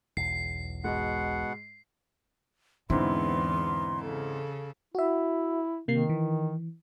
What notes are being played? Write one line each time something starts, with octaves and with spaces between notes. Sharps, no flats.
E1 B1 E2 C7
G#2 B2 G#3 F#5
E2 G#2 D3 B3 C4 E4 C6
C#3 A4
E4 F#4 E5
C3 D#3 A#3 C7
E3